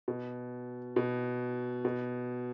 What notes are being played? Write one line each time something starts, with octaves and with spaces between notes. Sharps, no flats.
B2
B2
B2